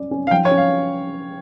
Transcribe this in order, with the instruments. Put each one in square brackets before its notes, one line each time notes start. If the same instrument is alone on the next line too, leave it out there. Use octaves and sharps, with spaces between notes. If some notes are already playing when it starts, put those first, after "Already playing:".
Already playing: [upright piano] C#4 D5
C#4
[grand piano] F5
[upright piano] F3 [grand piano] G5
[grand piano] C#5
[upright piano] C#4
[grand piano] F5